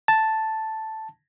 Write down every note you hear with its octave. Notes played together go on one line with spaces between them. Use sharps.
A5